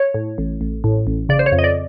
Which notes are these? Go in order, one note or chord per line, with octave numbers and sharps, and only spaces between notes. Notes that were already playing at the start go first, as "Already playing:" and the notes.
Already playing: C#5
A2
A1
A1
A2
A1
C#3 D5
C5
C#5
F2
D#5
D5